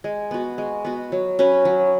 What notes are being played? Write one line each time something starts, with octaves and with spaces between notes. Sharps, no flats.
G#3
B3 F#4
G#3
B3 F#4
F#3
C#4 F#4 B4
F#3